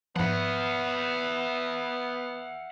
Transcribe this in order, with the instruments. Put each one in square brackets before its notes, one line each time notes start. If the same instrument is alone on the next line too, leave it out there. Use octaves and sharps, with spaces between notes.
[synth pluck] G#2 F3 [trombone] B3 [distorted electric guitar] E5 F#5